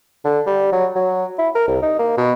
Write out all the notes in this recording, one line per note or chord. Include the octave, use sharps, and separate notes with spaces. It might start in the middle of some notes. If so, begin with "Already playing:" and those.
D3
G3
F#3
F#3
E4
A#4
C2
D#4
A#3
B2